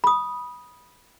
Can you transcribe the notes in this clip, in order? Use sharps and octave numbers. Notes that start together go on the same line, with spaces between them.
B5 D#6